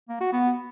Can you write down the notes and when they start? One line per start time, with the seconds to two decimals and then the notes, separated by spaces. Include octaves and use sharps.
0.09 A#3
0.21 F#4
0.32 B3